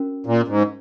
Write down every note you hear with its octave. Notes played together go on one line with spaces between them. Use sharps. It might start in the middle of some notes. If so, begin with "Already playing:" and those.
Already playing: C#4 F#4 A#4
A#2
G#2